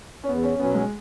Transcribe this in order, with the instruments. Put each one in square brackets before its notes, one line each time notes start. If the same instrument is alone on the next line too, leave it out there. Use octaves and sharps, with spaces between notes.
[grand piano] C#4
[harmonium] E2 [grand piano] B3
[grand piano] C#4
[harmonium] B2 F#3 C#4 [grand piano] B3
[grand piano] G#3